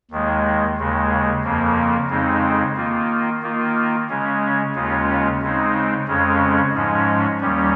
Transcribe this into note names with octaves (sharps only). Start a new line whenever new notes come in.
D#2 D#3 G#3
D#2 C#3 G#3
F2 C#3 F3 A#3
F2 C#3 G#3 C4 D#4
D#3 A#3 F4
D#3 A#3 F4
C#3 G#3 C#4
D#2 C#3 G#3 C#4 F4
C#3 G#3 C4 D#4
F2 C#3 G#3 C#4
G#2 F3 G#3 C#4
D#2 D#3 G3 C#4